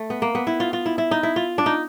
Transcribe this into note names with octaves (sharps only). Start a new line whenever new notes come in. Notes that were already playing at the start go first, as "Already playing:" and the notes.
Already playing: A3
B3
A#3
B3
E4
F4
F4
E4
E4
D#4
E4
F4
D4
D#4